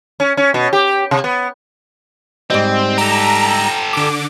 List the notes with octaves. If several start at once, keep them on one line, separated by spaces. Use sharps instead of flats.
C#4
C#4
B2
G4
C3
B3
G#2 G3 C4 D#5
G4 A4 A#5
D3 D6